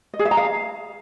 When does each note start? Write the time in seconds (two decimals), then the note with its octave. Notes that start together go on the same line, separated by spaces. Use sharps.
0.14 D#5
0.19 G#4
0.25 E5
0.31 A#5
0.37 F5